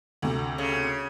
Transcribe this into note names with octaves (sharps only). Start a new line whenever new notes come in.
D2 C3
C#3